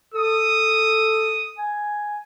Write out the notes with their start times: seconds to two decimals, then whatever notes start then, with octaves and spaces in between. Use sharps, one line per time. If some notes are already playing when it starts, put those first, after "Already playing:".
0.14 A4 D#6
1.58 G#5